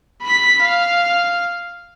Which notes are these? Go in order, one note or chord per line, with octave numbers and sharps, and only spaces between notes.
B5 B6
F5